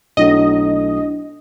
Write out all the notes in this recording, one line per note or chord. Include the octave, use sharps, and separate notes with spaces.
B1 F#3 A3 D4 E4 D#5